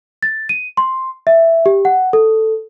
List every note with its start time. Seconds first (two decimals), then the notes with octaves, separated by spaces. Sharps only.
0.23 A6
0.49 D#7
0.77 C6
1.27 E5
1.66 G4
1.85 F#5
2.13 A4